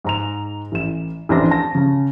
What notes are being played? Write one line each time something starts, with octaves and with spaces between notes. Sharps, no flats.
G#2 A#5 F7
A1 E7
A1 F2 C4 D4 D5 A#6
A5 A#6
C#3 A5